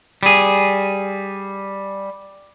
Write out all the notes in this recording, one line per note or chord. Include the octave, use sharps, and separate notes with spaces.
G3 G#4